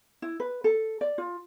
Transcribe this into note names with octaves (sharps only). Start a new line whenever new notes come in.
E4
B4
A4
D5
F4